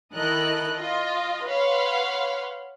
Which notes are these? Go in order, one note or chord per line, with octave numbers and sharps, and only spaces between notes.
D#3 E4 A4 A#4 D#5 F#6
F4 D#5
B4 C#5 F5 F#5 B5 C6